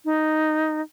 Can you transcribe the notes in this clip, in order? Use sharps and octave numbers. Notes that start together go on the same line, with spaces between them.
D#4